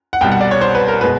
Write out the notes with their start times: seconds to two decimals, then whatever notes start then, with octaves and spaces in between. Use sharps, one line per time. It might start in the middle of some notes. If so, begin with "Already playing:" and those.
0.13 F#5
0.21 C2 B2 G3 G5
0.31 F#5
0.41 D5
0.51 C#5
0.61 C5
0.75 B4
0.88 A#4
1.01 B2 G#3 B4